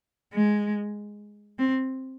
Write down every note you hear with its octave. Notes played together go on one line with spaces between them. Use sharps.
G#3
C4